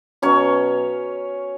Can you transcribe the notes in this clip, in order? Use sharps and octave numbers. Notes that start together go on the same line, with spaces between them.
B2 F#3 C#4 C#5